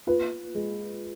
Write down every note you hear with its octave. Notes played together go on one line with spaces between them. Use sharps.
F4 B4
G#3